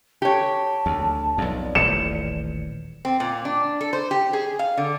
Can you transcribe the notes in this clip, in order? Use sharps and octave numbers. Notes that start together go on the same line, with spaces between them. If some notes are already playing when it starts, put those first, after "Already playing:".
G4 C#5 A5
D2
B1 F2 D5
D#1 A1 C#7 E7
C4
A#2
D4
A4
C5
G4
G#4
F5
D3